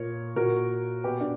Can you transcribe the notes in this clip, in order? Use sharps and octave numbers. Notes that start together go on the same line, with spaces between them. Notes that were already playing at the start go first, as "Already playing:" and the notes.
Already playing: A#2 A#4 C#5
A#2 F#4 A#4
B2 G4 B4
D4